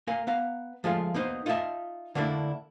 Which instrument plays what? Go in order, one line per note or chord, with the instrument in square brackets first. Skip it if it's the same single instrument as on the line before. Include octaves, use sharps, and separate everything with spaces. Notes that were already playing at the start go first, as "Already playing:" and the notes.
[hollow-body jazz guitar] A#3 A#4 F5 G#5
B3 F5 A#5
F3 G#3 A3 F4
A#3 B3 D#4 C5
D#4 F4 A#4 C#5 E5 A5
D3 A3 A#3 D4 E4